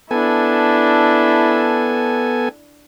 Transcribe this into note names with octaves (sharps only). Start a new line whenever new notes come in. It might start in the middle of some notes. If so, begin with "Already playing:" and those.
B3 D4 E4 A4 G#5